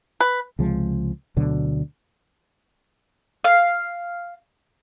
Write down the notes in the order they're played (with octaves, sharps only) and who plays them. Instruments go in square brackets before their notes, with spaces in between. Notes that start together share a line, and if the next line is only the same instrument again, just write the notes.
[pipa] B4
[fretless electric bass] C#2 C3 F3 G#3
D2 B2 D3 F#3
[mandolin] F5